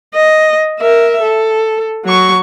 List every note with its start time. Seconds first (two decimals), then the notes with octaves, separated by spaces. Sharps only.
0.15 D#5
0.80 A#4 E5
1.23 A4
2.05 F#3 C#6